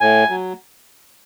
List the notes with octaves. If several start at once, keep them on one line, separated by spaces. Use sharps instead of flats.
A2 G#5
F#3